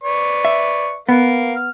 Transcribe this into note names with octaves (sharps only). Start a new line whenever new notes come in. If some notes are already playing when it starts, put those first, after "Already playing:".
B4 D5 C#6
E5
B3 A#4 F5
F6